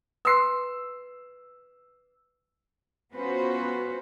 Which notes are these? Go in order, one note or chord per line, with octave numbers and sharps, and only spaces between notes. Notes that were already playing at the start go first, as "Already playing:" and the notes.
B4 C6 E6 F#6 C7
B3 C#4 F4 F#4 B4 C5